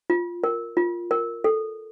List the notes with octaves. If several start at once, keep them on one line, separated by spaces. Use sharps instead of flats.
F4
A#4
F4
A#4
A4